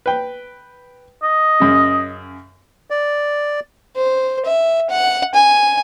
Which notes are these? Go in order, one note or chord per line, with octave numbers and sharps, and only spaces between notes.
B4 G5
D#5
F#2 C#3
D5
C5
E5
F#5
G#5